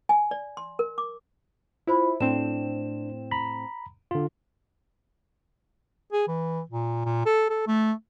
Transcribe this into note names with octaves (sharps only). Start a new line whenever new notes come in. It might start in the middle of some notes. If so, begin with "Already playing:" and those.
G#5
D5
C6
A#4
D6
E4 F4 C5 B5
A2 C4 D4 E7
A#5 B5
D3 F4
G#4
E3
A#2
A#2
A4
A4
A3